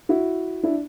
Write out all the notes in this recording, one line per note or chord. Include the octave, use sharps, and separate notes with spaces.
E4 F#4
D4 E4